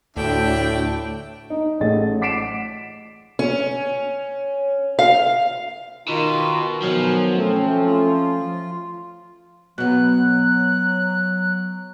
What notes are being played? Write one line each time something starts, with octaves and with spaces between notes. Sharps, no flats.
D2 A2 D4 E5 G5
D#4
A1 A2 A3 G#4 D#5 A6
F#5 D6 B6 C7 D7 E7
C#4
F5
B2 D#3 D#4 F4
B2 D#3 F3 F#3 G#5
A3 C4 C#4
F4
B2 F#3 B3 F#6